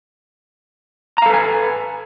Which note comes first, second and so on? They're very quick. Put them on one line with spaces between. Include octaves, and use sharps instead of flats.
A#5 F5 A4 B4 G#5